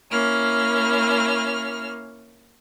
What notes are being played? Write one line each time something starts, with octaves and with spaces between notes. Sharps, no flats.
A#3 C#4 E4 F6